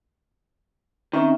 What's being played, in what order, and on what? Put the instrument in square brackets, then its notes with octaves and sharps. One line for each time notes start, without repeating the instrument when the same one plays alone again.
[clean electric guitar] D#3 [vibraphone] C4 C#4 E5